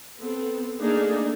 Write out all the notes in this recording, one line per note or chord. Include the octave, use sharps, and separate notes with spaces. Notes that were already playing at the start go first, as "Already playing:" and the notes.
B3 C4 A4
A3 A#3 D4 D#4 G#4 A4